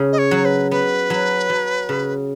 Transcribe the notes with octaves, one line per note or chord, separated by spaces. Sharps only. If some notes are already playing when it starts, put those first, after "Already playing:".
Already playing: C#3
D#5
C#5
F#3
B4
B3 B4
F#3
F#3
C#3